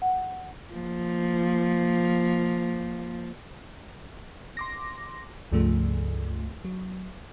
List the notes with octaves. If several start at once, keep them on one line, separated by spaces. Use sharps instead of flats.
F#5
F3 A#3
C6 D6 A#6
C#2 G2 C#3 F3 A3
F#3